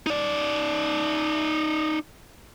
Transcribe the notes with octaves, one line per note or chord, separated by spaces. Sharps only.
D#4 D5